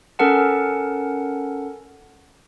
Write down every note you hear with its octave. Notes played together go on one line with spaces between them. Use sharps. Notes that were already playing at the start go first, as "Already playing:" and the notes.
C#4 A4 A#4 F#5 A5